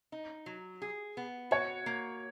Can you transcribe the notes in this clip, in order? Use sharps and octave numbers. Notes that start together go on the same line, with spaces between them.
D#4
F#3
G#4
B3
F#4 C#5
A#3